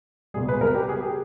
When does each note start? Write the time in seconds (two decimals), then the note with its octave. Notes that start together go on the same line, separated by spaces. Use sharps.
0.34 C#2 B2 G3 G#4
0.48 B4
0.61 A#4
0.75 G4
0.89 G#4
1.02 G4